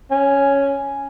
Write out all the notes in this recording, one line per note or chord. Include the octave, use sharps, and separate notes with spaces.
C#4